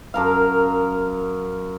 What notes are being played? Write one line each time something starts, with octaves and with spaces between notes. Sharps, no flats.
F#2 A#4 F5